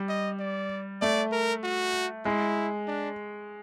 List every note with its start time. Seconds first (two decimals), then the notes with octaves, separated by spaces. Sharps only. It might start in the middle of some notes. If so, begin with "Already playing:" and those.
Already playing: G3
0.09 D#5
0.40 D5
1.02 A3 D5
1.32 A#4
1.64 F#4
2.25 G#3 E4
2.88 D4